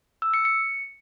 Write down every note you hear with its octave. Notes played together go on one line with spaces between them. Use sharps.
E6
C#7
C#7